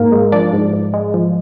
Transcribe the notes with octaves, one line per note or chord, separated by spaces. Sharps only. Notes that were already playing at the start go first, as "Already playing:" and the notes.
Already playing: G#2 A#3 A#4
G#3
F3 D4 D5
G#2
G#2
G#3
F3